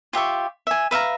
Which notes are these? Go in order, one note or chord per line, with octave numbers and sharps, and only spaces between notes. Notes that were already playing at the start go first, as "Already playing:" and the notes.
F4 G4 E5 C#6
E5 G#5
B4 E5 F5 A#5